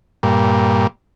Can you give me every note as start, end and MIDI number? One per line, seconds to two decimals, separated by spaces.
0.23 0.87 43
0.23 0.87 46